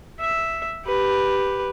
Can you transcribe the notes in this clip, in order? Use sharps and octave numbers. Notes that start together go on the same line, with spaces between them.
E5
G4 B4